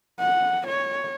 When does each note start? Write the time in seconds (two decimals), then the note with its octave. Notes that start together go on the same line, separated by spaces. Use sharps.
0.20 F#5
0.67 C#5